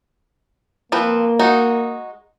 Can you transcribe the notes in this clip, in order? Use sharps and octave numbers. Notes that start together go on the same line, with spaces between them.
F3 A#3 C4 B4
G#3 D#4 F#4